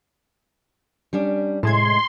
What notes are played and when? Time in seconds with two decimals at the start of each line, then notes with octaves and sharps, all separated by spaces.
1.13 G3 C#4 D4
1.63 A2 C3 G#3 A5 C6 G#6